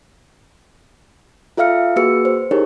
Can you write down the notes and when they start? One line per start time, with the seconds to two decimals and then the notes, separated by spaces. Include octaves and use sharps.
1.57 F4 A4 E5 F5 F6 C#7
1.96 A#3 F#4 G#4 B4 E6 C#7
2.25 C5
2.51 D#4 E4 G4 G#4 A#4 C#5